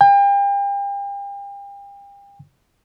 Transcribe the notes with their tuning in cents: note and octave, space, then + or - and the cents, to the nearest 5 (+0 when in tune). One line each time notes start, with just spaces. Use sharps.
G5 +40